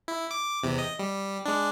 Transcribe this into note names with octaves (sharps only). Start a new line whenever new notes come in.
E4
D6
E2 C3
D#5
G3
G#3 D4